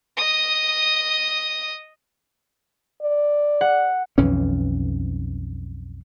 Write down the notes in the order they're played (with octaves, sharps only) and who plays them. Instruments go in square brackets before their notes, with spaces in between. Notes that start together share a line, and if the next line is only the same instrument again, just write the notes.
[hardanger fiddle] D#5 D#6
[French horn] D5
[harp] F#5
[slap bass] B1 F2 E3 C#4